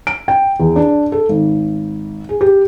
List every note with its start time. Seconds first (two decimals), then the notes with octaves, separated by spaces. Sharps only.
0.07 D7
0.28 G5
0.60 E2
0.76 D4
1.12 A4
1.29 G#1
2.29 G#4
2.41 G4